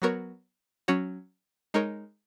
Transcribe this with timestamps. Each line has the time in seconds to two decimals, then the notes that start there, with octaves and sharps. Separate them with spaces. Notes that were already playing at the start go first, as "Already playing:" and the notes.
0.02 F#3 B3 F#4 A#4 C#5
0.88 F#3 C#4 F#4 C#5
1.74 G#3 D#4 A#4 C#5